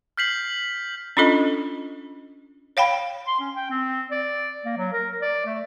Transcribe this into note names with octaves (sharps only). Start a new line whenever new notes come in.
F6 G6 B6 C7 F#7
C#4 D4 F4 A4 D#5
C#5 F5 G5 B5
C6
C#4
G5
C4
D5
A#3
F#3
A#4
D5
A3